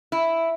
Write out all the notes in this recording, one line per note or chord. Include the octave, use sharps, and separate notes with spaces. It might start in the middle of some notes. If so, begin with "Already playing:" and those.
E4